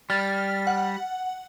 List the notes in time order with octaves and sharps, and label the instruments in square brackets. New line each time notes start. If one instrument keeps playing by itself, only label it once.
[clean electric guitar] G3 [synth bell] F6 A6
[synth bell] F#5